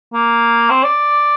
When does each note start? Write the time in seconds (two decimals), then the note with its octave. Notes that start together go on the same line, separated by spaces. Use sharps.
0.13 A#3
0.70 C4
0.84 D5